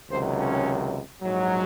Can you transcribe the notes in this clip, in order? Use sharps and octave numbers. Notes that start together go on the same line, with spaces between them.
C#2 C3 D#3 F#3 C5
C#4
A#1 G#2 F#3